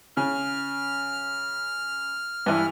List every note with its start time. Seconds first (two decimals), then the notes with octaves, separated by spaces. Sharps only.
0.17 C#3 F6
2.46 G2 E3